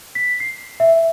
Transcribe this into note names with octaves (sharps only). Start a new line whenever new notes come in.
B6
C7
E5